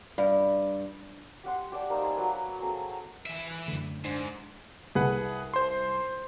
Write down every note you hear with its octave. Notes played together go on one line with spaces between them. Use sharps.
G2
G4 F#5 C6
G4 D5 A5
G3 A#3 D#4 C5
E5 G#5 A5 C6
F#3 A#3 B4
F#3 C4 G#4 A4
E3 E5
G#5 F#6
F#2 D3 A3
G#2 D4 C5 G#5
C2 G#4 B4 F#5
C5 C6